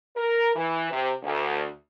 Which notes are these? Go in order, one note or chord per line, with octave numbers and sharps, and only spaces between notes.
A#4
E3
C3
D2